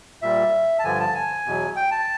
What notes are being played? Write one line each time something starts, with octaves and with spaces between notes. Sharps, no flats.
A#2 G3 E5
A5
G2 D3 F3 G#5
A5
G#5
E2 B2 F#3
G5
A5